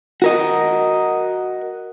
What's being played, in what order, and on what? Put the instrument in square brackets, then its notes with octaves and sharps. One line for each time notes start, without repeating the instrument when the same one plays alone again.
[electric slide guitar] F#4 A#4 D#5